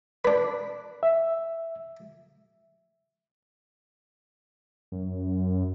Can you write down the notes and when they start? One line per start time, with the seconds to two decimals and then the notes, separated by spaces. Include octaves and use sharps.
0.25 D4 B4
1.03 E5
4.92 F#2